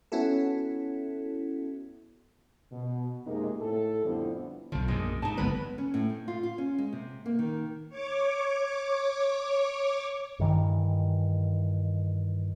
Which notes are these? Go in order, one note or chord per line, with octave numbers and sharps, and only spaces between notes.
B3 C#4 E4 F#4 A4
B2
F2 C3 G#3 A#3 D#4 A#4
A2 A4
F2 D3 F3 G3 B3 E4
B1 D3 F3
A#1 F#2 A#2 G#3
G#2 D#4 A5
F#1 D3 G#3 B3 B4
C#4
A2
C4
F4
F4
C#4
G#3
C3
A#3
D#3
C#5 D6
G2 D#3 E3